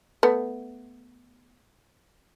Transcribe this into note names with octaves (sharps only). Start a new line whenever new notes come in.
A3 B3